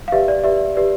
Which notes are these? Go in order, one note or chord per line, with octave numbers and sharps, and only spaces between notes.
F5
G4 B4 D5 E5
D5
G4 B4 D5 E5
G4 B4 D5